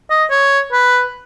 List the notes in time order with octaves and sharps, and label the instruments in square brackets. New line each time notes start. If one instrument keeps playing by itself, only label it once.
[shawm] D#5
C#5
B4